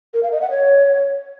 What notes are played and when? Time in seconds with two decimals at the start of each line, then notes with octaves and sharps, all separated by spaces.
0.14 A#4
0.23 F5
0.32 D#5
0.41 F#5
0.50 C#5